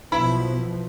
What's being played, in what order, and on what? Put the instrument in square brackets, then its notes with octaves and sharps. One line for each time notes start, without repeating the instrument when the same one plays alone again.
[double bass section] B1 B2 F3 [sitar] E4 [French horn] B4 [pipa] B5